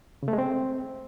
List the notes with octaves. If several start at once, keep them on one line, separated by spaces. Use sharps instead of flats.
C#3
A3
G#3
C4